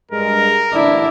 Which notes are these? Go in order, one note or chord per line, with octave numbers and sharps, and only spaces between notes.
G2 G#3 A#4
A1 D3 D4 E4